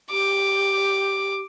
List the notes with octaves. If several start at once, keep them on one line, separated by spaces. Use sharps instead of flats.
G4 D6